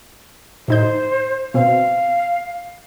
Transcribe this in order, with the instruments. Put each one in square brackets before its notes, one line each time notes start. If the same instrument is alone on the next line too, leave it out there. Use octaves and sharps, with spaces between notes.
[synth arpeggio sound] A2 D#4 G6 [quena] C5
[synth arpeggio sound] B2 C4 [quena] F5